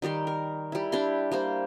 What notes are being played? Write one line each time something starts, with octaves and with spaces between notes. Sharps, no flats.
D#3 G3 G4 C6
A#4
G3 E4
D4 E4 G4 C6
G3 A#3 C5